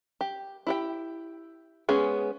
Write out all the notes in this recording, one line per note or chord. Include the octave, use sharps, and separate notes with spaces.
G4
E4 G4 G5
G#3 B3 C#4 G#4